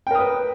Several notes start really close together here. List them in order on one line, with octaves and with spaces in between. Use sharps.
G5 A#4 D#6 B4